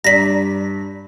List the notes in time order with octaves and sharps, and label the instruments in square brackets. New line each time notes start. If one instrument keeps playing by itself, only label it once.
[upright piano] G2 [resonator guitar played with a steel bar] D5 A#5 [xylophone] A#6 B6